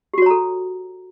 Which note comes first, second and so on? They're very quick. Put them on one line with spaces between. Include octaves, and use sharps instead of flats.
G4 F#4 C#5 A#5 A4